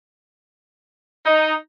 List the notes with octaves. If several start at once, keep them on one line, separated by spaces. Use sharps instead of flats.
D#4